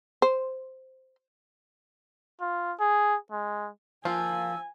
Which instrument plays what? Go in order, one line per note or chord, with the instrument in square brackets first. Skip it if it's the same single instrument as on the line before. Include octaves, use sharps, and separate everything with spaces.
[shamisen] C5
[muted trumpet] F4
G#4
G#3
[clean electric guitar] F3 [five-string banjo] A#3 F4 [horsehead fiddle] G#5 [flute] E6